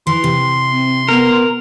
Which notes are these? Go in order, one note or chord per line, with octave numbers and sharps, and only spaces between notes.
E3 C6
C3
C4
B3 A#4